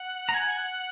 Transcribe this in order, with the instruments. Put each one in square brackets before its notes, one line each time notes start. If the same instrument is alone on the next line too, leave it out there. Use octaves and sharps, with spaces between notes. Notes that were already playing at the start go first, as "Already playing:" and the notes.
Already playing: [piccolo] F#5
[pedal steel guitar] A#5
G#5